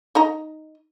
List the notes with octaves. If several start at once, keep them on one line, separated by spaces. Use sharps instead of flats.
D#4 D#5 A#5